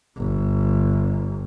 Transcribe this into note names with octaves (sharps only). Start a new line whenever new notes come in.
G1